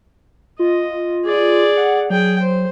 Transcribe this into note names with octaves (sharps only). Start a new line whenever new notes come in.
F4 D#5
G#4 D5
F#5
F#3 G#4 G5
C5